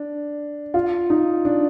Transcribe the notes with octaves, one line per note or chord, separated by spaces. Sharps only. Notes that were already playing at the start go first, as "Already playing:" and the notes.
Already playing: D4
F4
D#4
D4